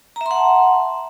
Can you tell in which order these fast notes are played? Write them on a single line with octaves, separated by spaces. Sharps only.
A#5 E5 C6 F#5 A5